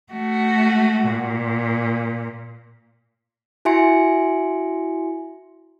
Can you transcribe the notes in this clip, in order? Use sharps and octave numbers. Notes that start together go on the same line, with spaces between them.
A3 F#4
A#2
E4 F#4 E5 G#5 C6 C#7